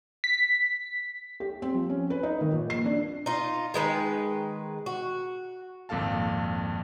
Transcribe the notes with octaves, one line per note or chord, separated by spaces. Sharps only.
B6
G4
C4
F3
C#4
B4
D#4
D#3
A#1
C7
D4
D#4 F4
D#3 G#3 B4
F#4
G#1 F2 A#2 A4 F5 A5